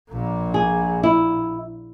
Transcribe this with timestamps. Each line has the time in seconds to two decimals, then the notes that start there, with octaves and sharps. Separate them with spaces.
0.10 A#1 A#2
0.54 G#4
1.03 E4